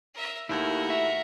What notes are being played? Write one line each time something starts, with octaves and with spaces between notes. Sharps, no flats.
A#4 E5
D#2 A3 E4 F#4 A#4
E5